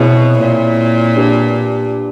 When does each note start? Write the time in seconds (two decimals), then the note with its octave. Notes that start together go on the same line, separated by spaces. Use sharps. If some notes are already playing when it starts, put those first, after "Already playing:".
Already playing: B2 C4 E4 G#4 C#5 E5
0.40 A#2
1.16 D4 G4 B4